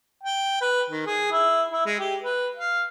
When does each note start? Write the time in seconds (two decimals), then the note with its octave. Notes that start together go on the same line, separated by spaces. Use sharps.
0.24 G5
0.61 B4
0.90 D#3
1.06 G#4
1.31 E4
1.72 E4
1.86 G#3
2.00 G4
2.23 B4
2.57 F5